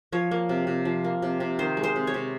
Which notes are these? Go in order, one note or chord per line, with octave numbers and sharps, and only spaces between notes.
F3 C#5
A#3
C3
C3
F3
A#3
C3
C3
D#3 C5
G#3
C5
C3
C#5
C3